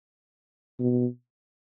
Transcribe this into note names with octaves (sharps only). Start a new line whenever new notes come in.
B2